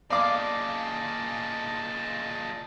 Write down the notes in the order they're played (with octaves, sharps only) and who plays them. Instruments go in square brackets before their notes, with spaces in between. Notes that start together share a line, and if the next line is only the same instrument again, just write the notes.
[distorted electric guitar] A#2 C#3 [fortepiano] D5 F5 D6 [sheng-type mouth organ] D#5 A5